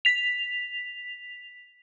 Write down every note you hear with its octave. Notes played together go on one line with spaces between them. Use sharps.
B6 F7